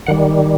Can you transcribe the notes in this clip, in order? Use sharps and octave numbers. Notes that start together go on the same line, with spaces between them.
D#3 G3 F#5